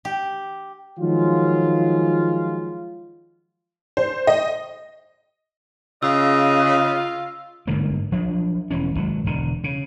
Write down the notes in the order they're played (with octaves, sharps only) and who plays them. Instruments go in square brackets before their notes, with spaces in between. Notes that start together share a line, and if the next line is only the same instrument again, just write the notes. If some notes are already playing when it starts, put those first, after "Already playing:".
[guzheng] G4
[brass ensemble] D#3 F3 F#3 G#3 F4
[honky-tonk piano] C5
D#5
[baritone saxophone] C#3 [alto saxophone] F4 [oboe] D#5 [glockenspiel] E6
[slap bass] G1 G#2 D3 A#3
F3 F#3 D4
E1 E3 C#4
G#1 F#3
E1 D3
C#3